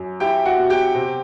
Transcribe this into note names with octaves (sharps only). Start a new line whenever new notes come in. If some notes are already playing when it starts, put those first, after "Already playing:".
Already playing: F#2
E4 G4 G5
F#4 F#5
B2
G4 G5
C3